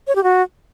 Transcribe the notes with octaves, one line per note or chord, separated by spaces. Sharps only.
C#5
G4
F#4